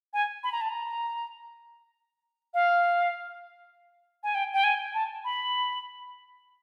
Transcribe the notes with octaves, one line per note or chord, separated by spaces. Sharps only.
G#5
B5
A#5
A5
A#5
F5
G#5
G5
G5
G#5
A5
B5